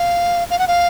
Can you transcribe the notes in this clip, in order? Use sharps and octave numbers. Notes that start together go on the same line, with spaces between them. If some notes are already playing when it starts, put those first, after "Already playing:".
Already playing: F5
F5
F#5
F5